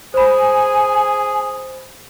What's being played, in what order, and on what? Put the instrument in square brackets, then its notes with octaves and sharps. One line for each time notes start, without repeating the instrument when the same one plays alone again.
[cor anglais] G#4 [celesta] C5 B5 [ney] G#5